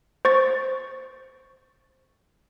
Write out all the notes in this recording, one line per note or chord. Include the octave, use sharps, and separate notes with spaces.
C5 C#6 A6